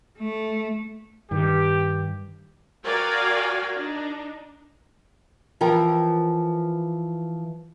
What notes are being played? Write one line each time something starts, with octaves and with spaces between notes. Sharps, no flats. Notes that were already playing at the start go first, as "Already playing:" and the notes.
A3
G2 D#3 G4
F#4 A#4 D5 F5 G5 G#5
D4 D#4
E3 F3 A#4 G5